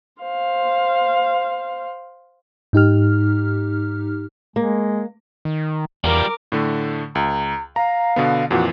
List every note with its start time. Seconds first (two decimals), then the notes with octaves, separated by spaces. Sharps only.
0.22 C5 F5
2.73 G#2 D#4 G4 F6
4.56 G#3 A#3
5.45 D#3
6.04 E2 G3 F4 A#4 D6
6.52 A2 D3 A3
7.15 C#2 A#5
7.76 F5 A#5
8.16 B2 D3 B3
8.51 F2 A#2 E3 F#4